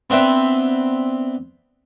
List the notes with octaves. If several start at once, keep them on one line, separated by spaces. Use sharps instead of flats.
B3 C4 D4 B4 E5 G5